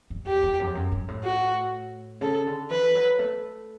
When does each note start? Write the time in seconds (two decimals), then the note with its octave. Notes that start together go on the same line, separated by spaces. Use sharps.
0.10 G2
0.27 E2 G4
0.43 E2
0.60 F#2
0.67 E2
0.75 F#2
0.92 G2
1.08 A2
1.24 F#4
2.21 C#3 A4
2.47 D3
2.70 E3 B4
2.95 F#3
3.19 A3